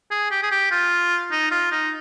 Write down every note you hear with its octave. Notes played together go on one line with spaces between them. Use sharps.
G#4
G4
G#4
G4
F4
D#4
F4
D#4